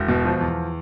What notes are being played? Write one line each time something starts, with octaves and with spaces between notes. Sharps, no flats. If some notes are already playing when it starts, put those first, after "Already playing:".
Already playing: E1
B2
F3
E2